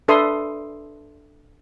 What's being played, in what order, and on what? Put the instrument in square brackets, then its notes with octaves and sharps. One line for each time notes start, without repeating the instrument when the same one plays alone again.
[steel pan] D4 A4 B4 E5 C6 D#6